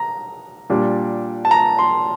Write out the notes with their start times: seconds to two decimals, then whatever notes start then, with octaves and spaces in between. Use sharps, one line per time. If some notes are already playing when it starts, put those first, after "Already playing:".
Already playing: A#5
0.70 A#2 G3 D4
1.45 A5
1.51 A#5
1.79 C6